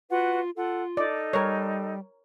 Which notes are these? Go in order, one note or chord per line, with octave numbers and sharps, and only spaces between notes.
F4 F#4 B4 F#5
F4 A4 F#5
D#4 A4 D5
G3 A#4 C#5